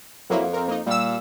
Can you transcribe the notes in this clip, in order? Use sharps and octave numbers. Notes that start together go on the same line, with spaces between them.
F2 F#3 A#3 E4
C4 A#4
A#3 D#4
A#2 G3 E6